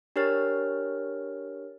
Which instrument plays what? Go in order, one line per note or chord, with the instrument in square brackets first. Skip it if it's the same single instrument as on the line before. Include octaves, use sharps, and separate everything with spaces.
[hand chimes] D4 G4 A#4 C#5 F6 A6